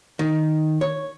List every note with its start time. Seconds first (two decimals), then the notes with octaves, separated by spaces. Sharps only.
0.19 D#3
0.81 C#5